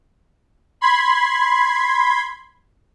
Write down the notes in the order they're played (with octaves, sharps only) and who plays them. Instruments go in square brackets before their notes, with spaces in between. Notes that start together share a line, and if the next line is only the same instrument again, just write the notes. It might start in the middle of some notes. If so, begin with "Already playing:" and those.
[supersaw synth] B5 C6 G#6